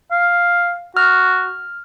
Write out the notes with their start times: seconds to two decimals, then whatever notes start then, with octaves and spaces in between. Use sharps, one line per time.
0.11 F5
0.97 F#4 F6